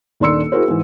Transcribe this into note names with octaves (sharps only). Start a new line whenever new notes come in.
D#1 D#3 D4 C6 E6 C#7
E4 F#4 G#4 A#4 C5
G#2 E3